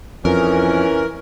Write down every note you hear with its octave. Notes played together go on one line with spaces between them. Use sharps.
F2 E3 C#4 A#4